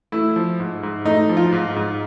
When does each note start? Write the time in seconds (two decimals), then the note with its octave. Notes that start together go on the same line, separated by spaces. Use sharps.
0.12 A3 E4
0.36 F3
0.60 G#2
0.83 G#2
1.05 A3 D#4
1.29 F3
1.37 F4
1.52 G#2
1.76 G#2